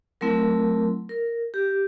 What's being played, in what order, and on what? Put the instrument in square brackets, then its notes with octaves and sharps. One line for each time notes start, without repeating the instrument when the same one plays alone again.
[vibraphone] F#3 A3 C4 E4 A#4
A#4
G4